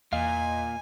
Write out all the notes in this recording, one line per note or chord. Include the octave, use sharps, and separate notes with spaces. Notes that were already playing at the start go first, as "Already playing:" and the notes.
E2 A#2 D#5 F5 G#5